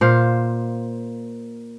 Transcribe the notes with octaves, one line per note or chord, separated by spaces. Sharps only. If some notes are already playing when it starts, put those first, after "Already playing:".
A#2 C5 F5